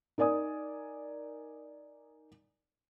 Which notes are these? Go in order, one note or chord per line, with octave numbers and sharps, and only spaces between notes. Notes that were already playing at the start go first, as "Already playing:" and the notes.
D#4 A#4 D5 G#5 D#6